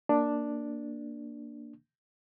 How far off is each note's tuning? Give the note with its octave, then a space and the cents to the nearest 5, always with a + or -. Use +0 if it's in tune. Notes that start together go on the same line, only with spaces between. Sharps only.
A#3 +0 D4 +0